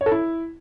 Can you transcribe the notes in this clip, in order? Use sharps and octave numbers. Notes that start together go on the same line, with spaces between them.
C#5
A4
E4